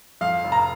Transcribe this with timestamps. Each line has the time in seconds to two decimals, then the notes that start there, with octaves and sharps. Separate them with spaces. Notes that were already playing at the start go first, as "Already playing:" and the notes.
0.21 F2 F5
0.44 F1
0.52 A#5